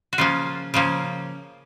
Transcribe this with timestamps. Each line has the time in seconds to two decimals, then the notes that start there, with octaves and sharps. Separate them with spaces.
0.13 F#4
0.18 C#3 F3 A#3 C#4 F4
0.74 C#3 F3 A#3 C#4